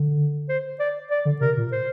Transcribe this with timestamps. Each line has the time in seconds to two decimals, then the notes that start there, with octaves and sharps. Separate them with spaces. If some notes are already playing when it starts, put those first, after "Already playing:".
Already playing: D3
0.49 C5
0.80 D5
1.11 D5
1.25 D3
1.41 C3 A#4
1.57 A#2
1.72 C5